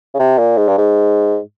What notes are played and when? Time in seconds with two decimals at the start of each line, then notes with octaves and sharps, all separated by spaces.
0.14 C#3
0.19 C3
0.39 A#2
0.57 G#2
0.68 G2
0.77 G#2